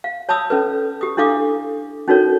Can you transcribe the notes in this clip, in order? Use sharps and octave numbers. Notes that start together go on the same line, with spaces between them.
F5
C#5 A5 B5 D#6 E6
C#4 A4 B4
G4 D#6
D4 E4 A4 F5 D6 D#6
C#4 D#4 F#4 A4 A#4 C#5